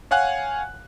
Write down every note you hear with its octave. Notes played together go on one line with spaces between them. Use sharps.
C#5 F5 F#5 G#5 F#6